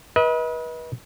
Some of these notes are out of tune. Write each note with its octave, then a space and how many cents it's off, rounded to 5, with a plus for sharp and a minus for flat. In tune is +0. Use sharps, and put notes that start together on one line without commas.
B4 -30 D#5 +35